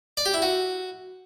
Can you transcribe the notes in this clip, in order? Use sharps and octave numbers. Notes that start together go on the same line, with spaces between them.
D5
G4
E4
F#4